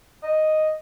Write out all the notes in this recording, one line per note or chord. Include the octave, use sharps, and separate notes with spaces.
D#5